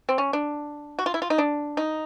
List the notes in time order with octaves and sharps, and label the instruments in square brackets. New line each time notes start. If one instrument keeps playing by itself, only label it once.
[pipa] C4
C#4
D4
F#4
F4
E4
F4
D#4
D4
D#4